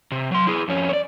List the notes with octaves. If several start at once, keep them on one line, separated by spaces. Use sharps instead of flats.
C3
F#3 C6
E4 G#4
F2 C#4
C#5 D5